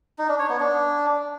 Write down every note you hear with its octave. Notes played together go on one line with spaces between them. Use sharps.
D#4
D4
C#5
B3
D4